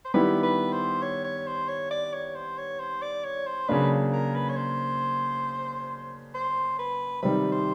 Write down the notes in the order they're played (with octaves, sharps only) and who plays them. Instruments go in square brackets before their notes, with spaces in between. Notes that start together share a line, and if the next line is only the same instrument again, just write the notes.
[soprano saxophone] C5
[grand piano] D#3 G3 B3 E4 G4 [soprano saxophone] B4
[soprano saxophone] B4
C5
C#5
C#5
C5
C#5
D5
C#5
C5
C#5
C5
D5
C#5
C5
[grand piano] C#3 F#3 A#3 D4 [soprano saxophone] B4
[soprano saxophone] A#4
B4
C#5
C5
C5
B4
[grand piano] C3 D#3 G3 [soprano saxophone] B4
[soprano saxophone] C5